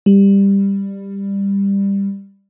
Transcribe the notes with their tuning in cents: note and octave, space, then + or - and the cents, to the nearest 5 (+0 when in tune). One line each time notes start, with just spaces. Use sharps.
G3 +15